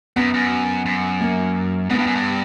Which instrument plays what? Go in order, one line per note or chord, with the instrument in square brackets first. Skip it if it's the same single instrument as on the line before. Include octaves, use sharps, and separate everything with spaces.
[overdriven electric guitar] F#2 [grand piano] B3
[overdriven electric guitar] F#2
F#2
[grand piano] A#3
[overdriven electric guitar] G#2 [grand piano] B3
[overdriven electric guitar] G2
F#2
G2